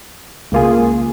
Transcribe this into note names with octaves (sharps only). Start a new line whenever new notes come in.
C#2 C#3 A#3 F4 G#4